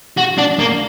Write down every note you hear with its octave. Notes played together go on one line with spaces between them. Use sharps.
F#4
D4
A#3